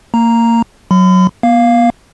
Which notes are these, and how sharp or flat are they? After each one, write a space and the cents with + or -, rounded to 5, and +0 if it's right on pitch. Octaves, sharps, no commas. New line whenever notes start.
A#3 -20 A#5 +0
F#3 -5 B5 +45
B3 -35 F5 +0